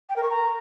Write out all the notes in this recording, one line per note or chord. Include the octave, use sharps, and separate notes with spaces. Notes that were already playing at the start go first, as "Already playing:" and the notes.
G5
A#4
C#6
A#5